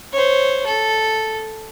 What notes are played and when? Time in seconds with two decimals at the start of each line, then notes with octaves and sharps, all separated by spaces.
0.13 C5 C#5
0.67 A4